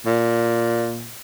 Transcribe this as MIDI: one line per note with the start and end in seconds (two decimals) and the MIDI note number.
0.06 1.14 46